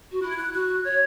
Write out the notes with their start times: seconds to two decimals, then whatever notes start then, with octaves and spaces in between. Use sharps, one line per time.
0.11 F#4
0.22 E4 F#6
0.30 G#6
0.37 F#6
0.54 F#4 F#6
0.84 C#5 G#6